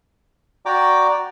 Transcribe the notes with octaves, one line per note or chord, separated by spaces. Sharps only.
F#4 D5 G5 A#5 D6